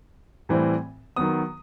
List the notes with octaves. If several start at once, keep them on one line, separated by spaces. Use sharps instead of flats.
A2 E3 G3 C4
D#3 F#3 B3 D#6